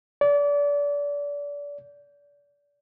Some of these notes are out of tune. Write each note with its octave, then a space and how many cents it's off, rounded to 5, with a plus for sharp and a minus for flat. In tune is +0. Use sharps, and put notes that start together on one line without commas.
D5 -30